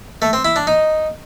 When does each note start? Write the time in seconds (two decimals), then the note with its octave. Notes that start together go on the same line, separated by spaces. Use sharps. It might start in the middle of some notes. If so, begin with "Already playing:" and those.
0.22 A3
0.33 C4
0.45 E4
0.56 D4
0.67 D#4